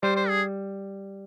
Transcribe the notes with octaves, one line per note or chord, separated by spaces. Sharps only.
G3 C5
C5
G#4